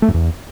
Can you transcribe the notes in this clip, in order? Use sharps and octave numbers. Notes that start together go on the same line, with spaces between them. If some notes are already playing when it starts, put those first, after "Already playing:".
A3
F#2
E2